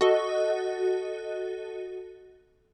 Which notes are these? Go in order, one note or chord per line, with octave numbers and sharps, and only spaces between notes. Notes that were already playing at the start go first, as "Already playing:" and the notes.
F#4 A4 D#5